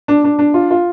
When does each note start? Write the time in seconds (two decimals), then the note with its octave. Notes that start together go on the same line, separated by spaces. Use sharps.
0.08 D4
0.24 D4
0.39 D4
0.54 F4
0.71 F4